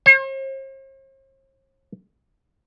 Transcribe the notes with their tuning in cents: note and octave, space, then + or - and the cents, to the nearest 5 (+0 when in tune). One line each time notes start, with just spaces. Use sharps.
C5 +45